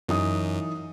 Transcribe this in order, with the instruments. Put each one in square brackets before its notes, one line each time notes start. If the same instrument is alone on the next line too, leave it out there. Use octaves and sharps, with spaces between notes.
[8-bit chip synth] F#2 [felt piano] E3 D#4 D#6